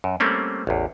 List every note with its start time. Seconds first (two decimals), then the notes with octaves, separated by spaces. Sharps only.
0.04 F#2
0.20 G3 A3 A#3 C4 C#4
0.67 A1 E2